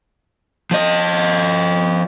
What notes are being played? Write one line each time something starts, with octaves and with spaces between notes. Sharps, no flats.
F3 D#5